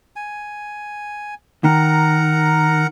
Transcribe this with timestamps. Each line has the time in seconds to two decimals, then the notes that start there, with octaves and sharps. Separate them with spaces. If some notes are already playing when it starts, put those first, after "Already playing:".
0.16 G#5
1.64 D#3 A#4 F#5 A#5